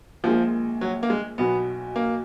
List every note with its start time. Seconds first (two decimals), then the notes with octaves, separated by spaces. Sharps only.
0.24 A#1 A#2 F3 G#3
0.81 F#3
1.03 A#3
1.10 G#3
1.38 B1 B2 F#3 B3
1.96 A#3